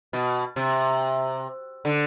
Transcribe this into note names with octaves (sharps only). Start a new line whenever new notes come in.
B2
C3
D3